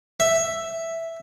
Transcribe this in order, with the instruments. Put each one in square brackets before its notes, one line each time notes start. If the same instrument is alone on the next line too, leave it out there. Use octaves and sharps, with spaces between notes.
[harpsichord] E5